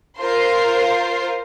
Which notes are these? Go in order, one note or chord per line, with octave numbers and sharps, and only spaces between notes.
F4 A#4 C5 C6